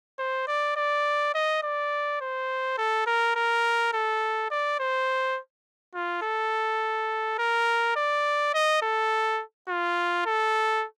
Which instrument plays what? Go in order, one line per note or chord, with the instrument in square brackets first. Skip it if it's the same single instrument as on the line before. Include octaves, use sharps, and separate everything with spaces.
[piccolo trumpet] C5
D5
D5
D#5
D5
C5
A4
A#4
A#4
A4
D5
C5
F4
A4
A#4
D5
D#5
A4
F4
A4